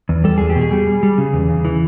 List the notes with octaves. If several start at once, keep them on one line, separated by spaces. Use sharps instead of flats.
E2
G3 A4
E2 G#4
G4
B2
G#4
G3
G3
G3
C#3
E2
C#3
E3